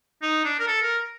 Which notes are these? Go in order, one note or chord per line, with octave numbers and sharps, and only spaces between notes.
D#4
D4
A#4
A4
A#4